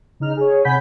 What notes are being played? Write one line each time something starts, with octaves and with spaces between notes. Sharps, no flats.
C#3 D#4 F6
G#4 C#5
C3 F#5 G#5 B5 G6 B6